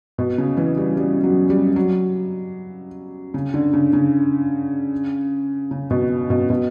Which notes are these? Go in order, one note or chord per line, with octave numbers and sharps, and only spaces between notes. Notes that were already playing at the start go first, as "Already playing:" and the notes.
B2
C#3
E3
G3
G3
F#3
G3
F#3
C#3
D3
C#3
C#3
C#3
B2
B2
B2